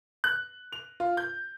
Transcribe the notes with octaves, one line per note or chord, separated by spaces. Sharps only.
F#6
F7
F4
G6